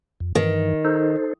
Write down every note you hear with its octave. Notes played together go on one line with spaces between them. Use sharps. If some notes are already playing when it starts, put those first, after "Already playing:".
F2
G2 D#3 E3
D#4 A4 C5